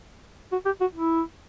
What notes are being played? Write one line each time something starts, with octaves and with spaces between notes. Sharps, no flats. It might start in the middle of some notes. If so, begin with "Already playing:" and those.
F#4
G4
F#4
E4